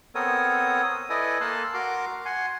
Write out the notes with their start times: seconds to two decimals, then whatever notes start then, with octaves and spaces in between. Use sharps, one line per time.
0.15 B3 C4 A4 A#4 C#5 D#6
0.83 D#6
1.10 E4 A4 B4 D5 D#5 G#5
1.41 A#3 A4 A5 C6 F#6
1.74 F#4 A#4 C6 D6
2.25 F#5 G#5 C6